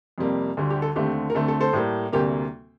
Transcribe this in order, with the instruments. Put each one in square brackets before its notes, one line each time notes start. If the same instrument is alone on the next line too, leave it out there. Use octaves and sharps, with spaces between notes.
[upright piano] F2 C3 G3 A#3
D2 D3 G3
G4
A4
D#2 D3 A3 C4 G4
A#4
D2 D3 A3 C4 A4
A4
A4 C5
A2 G3 A#3
D2 C3 G3 A#3 G4 A#4